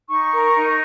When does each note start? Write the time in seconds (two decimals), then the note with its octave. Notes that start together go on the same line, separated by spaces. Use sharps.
0.08 D#4 C#6
0.32 A#4
0.55 D#4